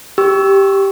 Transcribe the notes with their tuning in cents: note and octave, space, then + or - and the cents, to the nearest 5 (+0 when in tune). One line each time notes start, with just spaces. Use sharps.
G4 +0 C#6 +25 E6 +0